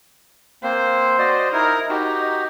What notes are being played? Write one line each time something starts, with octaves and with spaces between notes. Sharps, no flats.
A#3 C4 C5
F#4 D5 D#5
D#4 E4 A#4
D#4 F#4 G4